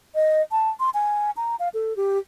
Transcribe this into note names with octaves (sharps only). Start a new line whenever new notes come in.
D#5
A5
C6
G#5
A#5
F5
A4
G4